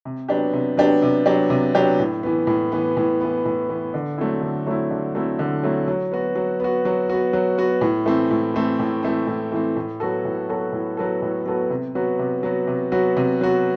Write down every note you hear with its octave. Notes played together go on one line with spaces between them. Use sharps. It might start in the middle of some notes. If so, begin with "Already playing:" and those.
C3
F#3 B3 D4 G4
C3
F#3 B3 D4 G4
C3
F#3 B3 D4 G4
C3
F#3 B3 D4 G4
A2
E3 B3
A2
E3 B3
A2
E3 B3
A2
E3 B3
D3
F#3 A3 C4 E4
D3
F#3 A3 C4 E4
D3
F#3 A3 C4 E4
D3
F#3 A3 C4 E4
F#3
B3 F#4
F#3
B3 F#4
F#3
B3 F#4
F#3
B3 F#4
A2
E3 A3 C4
A2
E3 A3 C4
A2
E3 A3 C4
A2
E3 A3 C4
A2
F#3 B3 F#4 A4
A2
F#3 B3 F#4 A4
A2
F#3 B3 F#4 A4
A2
F#3 B3 F#4 A4
C3
F#3 B3 F#4
C3
F#3 B3 F#4
C3
F#3 B3 F#4
C3
F#3 B3 F#4